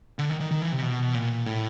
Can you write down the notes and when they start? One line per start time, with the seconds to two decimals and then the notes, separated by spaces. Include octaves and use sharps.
0.19 D3
0.29 D#3
0.40 D#3
0.51 D#3
0.62 E3
0.72 C3
0.82 B2
1.14 A#2
1.46 A2